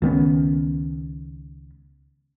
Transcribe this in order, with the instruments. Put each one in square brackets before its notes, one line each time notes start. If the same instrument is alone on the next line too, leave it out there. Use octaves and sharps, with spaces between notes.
[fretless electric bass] C#2 D#3 B3 C#4